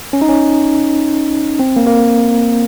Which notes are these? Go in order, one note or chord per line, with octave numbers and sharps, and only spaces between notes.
C#4
D#4
C#4
C4
A#3
A#3